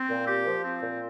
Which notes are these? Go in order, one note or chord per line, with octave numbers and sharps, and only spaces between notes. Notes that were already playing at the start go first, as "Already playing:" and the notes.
Already playing: C4
A#2
G4
F3
C4
A#2